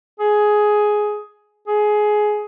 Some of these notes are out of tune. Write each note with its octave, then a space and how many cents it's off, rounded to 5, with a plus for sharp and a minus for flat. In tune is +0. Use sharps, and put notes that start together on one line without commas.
G#4 +10
G#4 +15